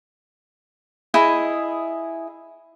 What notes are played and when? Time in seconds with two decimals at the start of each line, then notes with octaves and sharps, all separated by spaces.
1.14 E4 G#4 D#5